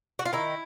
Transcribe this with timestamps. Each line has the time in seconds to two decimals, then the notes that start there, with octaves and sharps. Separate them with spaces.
0.19 F#4
0.25 F4
0.33 D#3 E4